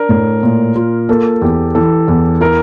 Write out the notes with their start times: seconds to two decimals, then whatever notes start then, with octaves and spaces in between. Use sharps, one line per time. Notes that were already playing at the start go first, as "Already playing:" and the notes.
Already playing: D4 A#4
0.09 A2
0.43 A#2
0.76 F4
1.09 A#3 A4
1.42 E2 G4
1.75 E3 A4
2.08 E2
2.40 E4 A#4